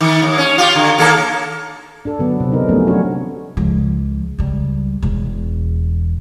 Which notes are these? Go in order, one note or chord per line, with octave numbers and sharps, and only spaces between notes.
D#3
D#2
C#4
F4 G4
D3
D#2 A#3 A4
D4 A4
D3 F#3 B3
C3 C4
D#4 A#4
F3 F#3 A3 B3 C#4
F#3 C#4 D4 F#4 C#5
C#2 F3
C#2 G3
E1 E2